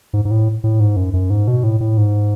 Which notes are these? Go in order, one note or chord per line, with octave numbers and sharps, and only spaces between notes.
G#2
G#2
A2
A2
G#2
F#2
F#2
G#2
B2
A2
A2
G#2